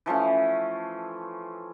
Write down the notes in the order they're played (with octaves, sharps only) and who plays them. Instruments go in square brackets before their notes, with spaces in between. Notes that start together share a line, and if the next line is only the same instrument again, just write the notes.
[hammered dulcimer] E3 F3 A3 C#4